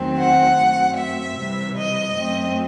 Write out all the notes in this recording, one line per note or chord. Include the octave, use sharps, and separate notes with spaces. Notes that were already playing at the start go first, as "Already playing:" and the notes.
Already playing: E2 D#3 F#3 A3 C4
F#5
F#2 F#3 A3 C4
E5
C3 E3 G3
D#5
F#2 F#3 A3 C4